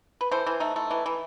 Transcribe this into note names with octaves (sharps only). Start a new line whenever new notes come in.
B4
E3 A4 C5
E3
A3 D#4
A3
E3
E3